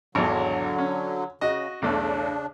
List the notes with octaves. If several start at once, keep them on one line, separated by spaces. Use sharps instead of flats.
G#1 E2 D3 F#3
C#4
C#3 F#4 D#5
B1 E2 C#3 A3 D4